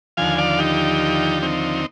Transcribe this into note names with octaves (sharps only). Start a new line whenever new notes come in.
D#2 D3 F3 F5 G#5
D5 F5
D#4 G4
C4 D#4